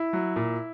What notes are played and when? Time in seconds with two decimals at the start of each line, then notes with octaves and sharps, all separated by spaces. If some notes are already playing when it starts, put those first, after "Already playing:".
Already playing: E4
0.13 F#3
0.36 A#2